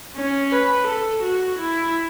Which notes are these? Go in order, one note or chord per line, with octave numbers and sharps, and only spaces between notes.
C#4
B4
A4
F#4
E4